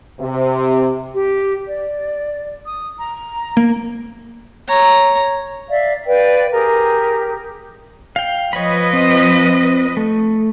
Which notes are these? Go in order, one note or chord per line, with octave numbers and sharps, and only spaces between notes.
C3
G4
D5
D#6
A#5
A#3
C#5 A#5
D5 E5 F5
B4 D5 F5 G5
G4 G#4 A#4
F5 G5
F3 B4 C#5 D#5 B5
C4
A3